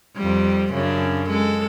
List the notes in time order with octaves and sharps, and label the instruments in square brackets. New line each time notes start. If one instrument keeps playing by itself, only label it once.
[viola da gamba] F2 G3
F#2 C#3 D4
G#3 A4